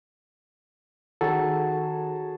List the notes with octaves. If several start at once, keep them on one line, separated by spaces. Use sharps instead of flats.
D#3 F#3 G#4 A4 A5